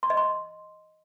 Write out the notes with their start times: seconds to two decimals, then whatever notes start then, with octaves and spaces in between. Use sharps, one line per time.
0.03 C6
0.10 D#5
0.17 C6